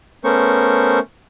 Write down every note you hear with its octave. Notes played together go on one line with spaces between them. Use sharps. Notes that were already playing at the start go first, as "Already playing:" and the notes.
A3 B3 C#4 A#4 C5 C#6